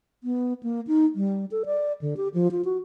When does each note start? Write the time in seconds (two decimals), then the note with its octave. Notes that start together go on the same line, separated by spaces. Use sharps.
0.24 B3
0.63 A#3
0.87 D#4
1.16 G3
1.51 A4
1.66 D5
2.01 D3
2.17 G4
2.34 F3
2.51 F4
2.65 F#4